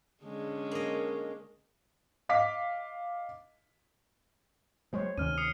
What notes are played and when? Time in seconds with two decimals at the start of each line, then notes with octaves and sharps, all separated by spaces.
0.24 D3 G#3 C#4
0.71 A#3 D#5
2.29 D#5 F5 D6 B6
4.93 F#3 G#3 C5 C#5
5.18 D2 C3 D#3 C#4 F6 D#7
5.38 D#6 C7 C#7